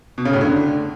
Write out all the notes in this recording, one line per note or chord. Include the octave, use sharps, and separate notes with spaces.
B2
C#3
A2
D3